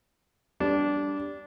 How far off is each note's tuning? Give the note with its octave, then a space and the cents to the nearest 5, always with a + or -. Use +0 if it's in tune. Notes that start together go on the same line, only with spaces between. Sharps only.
G3 +5 D4 -15